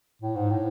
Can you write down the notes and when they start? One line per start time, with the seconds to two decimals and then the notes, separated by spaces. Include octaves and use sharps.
0.22 A2
0.35 G#2
0.50 A2